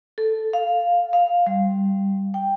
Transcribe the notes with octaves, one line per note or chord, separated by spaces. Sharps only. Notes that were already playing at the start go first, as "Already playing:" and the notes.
A4
F5
F5
G3
G5